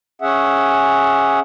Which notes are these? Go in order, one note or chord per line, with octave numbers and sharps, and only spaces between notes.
C#4 G#4 E5 F#5